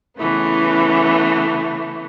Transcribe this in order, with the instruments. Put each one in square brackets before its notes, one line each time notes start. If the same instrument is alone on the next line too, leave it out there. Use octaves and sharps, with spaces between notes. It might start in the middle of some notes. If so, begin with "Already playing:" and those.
[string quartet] C#3 E3 A3 B3